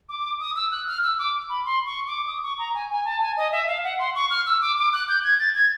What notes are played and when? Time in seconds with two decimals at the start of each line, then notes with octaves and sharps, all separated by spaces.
0.09 D6
0.40 D#6
0.56 E6
0.72 F#6
0.88 F6
1.03 E6
1.19 D6
1.49 B5
1.65 C6
1.86 C#6
2.07 D6
2.27 D#6
2.43 C#6
2.59 A#5
2.75 G#5
2.90 G#5
3.05 A5
3.21 G#5
3.37 D#5
3.52 E5
3.67 F5
3.84 F#5
3.99 C6
4.15 C#6
4.30 F6
4.46 E6
4.61 D6
4.78 D6
4.93 F#6
5.09 G6
5.24 G#6
5.39 A6
5.55 G#6